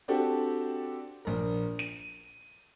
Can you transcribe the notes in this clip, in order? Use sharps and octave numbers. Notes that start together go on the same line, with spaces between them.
C4 D4 F#4 G4 A4
A#1 A#4
D#7